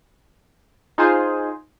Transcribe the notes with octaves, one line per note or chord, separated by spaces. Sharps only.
D#4 F4 G#4 C5